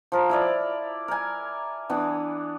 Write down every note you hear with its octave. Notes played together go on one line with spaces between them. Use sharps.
F3 A#4
E4 A#4 D5
A#4 G#5
E3 B3 D4